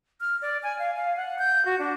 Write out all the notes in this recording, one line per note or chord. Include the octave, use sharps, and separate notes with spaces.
F6
D5
G#5
F5
F5
F#5
G6
F#4
D4